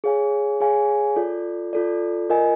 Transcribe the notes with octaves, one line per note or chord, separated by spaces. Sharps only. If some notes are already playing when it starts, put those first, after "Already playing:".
G#4 C#5 F5 G#5
G#4 C#5 F5 G#5
F4 A4 D5
F4 A4 D5
F4 A#4 D#5 G#5